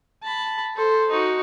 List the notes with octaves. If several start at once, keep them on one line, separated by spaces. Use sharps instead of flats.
A5 B5
A4 C5
D#4 F#4